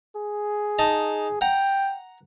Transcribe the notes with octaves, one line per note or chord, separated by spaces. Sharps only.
G#4
D#4 A5 A#5
F#5 G5 A#5